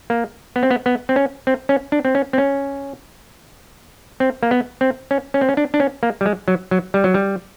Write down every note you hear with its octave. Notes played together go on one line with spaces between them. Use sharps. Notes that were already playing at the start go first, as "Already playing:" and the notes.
A#3
B3
C4
B3
B3
C4
C#4
C4
C#4
D4
C4
C#4
C4
C#4
C4
A#3
B3
C4
C#4
C#4
C4
C#4
D4
D4
C#4
A#3
G3
G#3
F#3
F#3
G3
F#3
G3